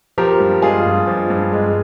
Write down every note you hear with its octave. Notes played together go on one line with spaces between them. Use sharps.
F3 G4 A#4
G2
G#3 F4 G#4
G2
F3
G2
G#3